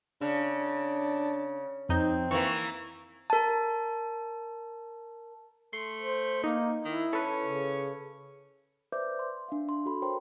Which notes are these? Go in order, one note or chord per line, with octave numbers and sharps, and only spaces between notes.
C#3 D4
F2 C4 D#4 G6
E3 A#3 C#6
A#4 A5
A3 C6
C5
A#3 D#4
D#3 E4
C#4 A4 B4
C#3
B4 C5 D5 E5 D6 G6
C6
D4 E5 F5
C6
F#4 A4 B5
A#4 C5 C#5 G5 A#5 C6